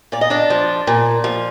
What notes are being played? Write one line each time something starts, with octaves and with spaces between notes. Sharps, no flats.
A#2 D5
D#5
D4 D5
F3
A#2
F3